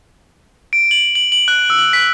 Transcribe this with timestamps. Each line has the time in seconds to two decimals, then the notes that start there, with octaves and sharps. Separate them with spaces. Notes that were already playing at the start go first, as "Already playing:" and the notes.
0.73 D7
0.91 F#7
1.15 F#7
1.32 F#7
1.48 F#6
1.70 E6
1.93 B6